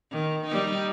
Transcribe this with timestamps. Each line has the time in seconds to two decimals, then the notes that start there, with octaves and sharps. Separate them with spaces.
0.12 D#3
0.47 G3 D#4